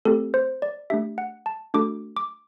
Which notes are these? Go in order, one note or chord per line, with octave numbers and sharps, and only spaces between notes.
A3 C4 G4 A4
C5
D5
A3 D4 G4 E5
F#5
A5
A3 D4 F#4 A4 D6
D6